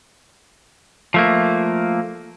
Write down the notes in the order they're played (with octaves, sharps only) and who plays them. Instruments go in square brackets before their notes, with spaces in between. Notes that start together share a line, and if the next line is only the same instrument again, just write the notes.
[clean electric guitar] F3 A3 A#3